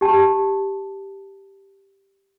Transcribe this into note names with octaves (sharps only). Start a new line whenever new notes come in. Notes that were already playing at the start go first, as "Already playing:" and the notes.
G4 A5